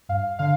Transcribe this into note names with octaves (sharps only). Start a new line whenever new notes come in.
G2 F5
D3 F5